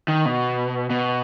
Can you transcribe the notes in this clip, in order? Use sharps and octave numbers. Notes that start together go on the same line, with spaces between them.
D#3
B2
B2